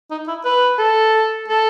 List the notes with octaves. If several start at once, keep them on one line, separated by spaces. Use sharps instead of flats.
D#4
E4
B4
A4
A4